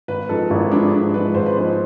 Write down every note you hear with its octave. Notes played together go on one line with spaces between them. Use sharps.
G#1 B4
G#2 F3 G#3 A4
G#1 E4
G#2 F3 G#3 D4
G#1 D4
G#2 F3 G#3 B4
G#1 C5
B4
G#2 F3 G#3 C5